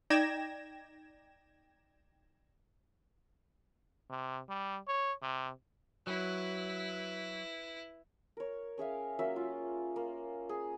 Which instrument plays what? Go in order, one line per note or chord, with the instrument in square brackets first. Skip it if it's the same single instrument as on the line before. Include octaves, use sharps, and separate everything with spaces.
[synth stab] D#4 D5 G5 G#6 A#6 E7
[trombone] C3
G3
C#5
C3
[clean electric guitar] F#3 [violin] E4 B4
[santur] A#4 C#5
C#4 G#4 E5 F5
F#3 A#3 C#4 E5
F4
A#3
G#4